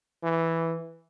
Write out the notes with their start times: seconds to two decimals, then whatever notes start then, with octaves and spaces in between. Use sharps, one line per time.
0.23 E3